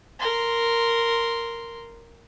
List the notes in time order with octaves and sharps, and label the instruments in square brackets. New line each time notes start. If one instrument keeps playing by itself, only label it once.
[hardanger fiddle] A#4 C6